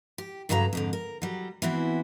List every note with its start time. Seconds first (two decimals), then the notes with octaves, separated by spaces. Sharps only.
0.18 G4
0.49 G2 C#3 F#3 A4 B4 A#5
0.73 F2 G#2 D3
0.93 A#4
1.22 F#3 G3
1.62 E3 B3 C4 E4 F#4